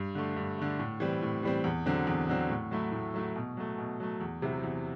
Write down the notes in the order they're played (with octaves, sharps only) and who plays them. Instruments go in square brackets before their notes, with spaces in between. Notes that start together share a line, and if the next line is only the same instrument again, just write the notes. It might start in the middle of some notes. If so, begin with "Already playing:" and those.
Already playing: [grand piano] G2
D3 A3
G2
D3 A3
A2
E3 G3 C4
A2
E3 G3 C4
E2
D3 F#3 C4
E2
D3 F#3 C4
A2
F#3 A3 E4
A2
F#3 A3 E4
B2
F#3 A3
B2
F#3 A3
E2
C3 F#3 C4 E4
E2